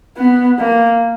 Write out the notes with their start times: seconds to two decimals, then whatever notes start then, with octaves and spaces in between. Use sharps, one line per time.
0.17 B3
0.59 A#3